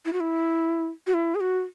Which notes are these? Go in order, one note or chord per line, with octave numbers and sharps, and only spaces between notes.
E4
F#4
E4
F#4
E4
G#4
F#4